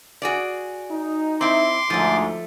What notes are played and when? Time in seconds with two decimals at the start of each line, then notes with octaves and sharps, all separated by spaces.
0.22 F#4 G#4 D5
0.90 D#4
1.41 C4 E4 C6 D6
1.90 D2 G#2 F3 A3